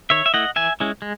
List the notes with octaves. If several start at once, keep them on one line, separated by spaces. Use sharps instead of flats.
D#3 C#5 E5
E5
A3 E4 D#5 F#5
E3 E5 G#5
G#3 C#4 E4
G#3